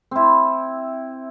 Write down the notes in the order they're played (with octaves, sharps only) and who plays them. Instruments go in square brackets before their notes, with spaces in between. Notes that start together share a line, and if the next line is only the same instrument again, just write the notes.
[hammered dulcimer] C4 E4